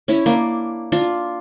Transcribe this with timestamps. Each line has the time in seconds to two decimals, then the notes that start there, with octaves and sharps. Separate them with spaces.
0.08 C#4 E4
0.26 A#3 D4
0.92 D4 F4